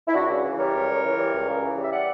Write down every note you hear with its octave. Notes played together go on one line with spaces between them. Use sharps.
E4
C#2 D4 F#4
C#3
E3
G3 A#4 C#5
C#2
C#3
E3
G3
C#2
C#3
E3
G3
E5
D5 F#5